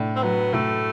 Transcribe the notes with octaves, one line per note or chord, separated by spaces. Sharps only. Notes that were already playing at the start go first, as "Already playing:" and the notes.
Already playing: A2 D4
C4
F#3 B3
A2 A3